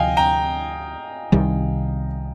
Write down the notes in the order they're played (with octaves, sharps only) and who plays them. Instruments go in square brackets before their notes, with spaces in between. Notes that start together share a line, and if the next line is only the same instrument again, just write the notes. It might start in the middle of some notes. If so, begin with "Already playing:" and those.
Already playing: [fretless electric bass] D2 C3 F3 [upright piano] D#5 F5 G5 G#5
[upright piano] G5 A#5
[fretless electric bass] C2 C3 D#3 G3